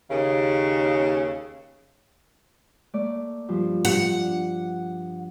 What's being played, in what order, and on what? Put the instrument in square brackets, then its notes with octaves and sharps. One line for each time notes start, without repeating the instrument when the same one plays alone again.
[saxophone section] D#2 C#3
[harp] A3 A#3 D5
G2 F3
[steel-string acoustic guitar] F#5
[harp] D4